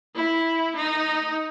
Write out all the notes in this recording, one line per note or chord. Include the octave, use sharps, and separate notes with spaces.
E4
D#4